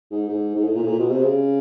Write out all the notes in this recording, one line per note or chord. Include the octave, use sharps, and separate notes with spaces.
G#2
G#2
G#2
A2
A#2
A2
A#2
B2
C3
C#3